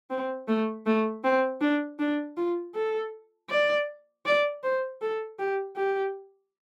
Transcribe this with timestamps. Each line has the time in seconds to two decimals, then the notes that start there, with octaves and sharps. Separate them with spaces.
0.10 C4
0.48 A3
0.86 A3
1.24 C4
1.61 D4
1.99 D4
2.37 F4
2.75 A4
3.50 D5
4.26 D5
4.63 C5
5.01 A4
5.39 G4
5.76 G4